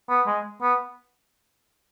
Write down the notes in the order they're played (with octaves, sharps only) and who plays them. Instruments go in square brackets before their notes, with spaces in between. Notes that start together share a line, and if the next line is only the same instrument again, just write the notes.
[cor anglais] B3
G#3
B3